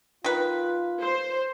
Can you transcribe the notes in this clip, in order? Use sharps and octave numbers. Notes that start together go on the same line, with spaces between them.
D#3 F4 B4
C5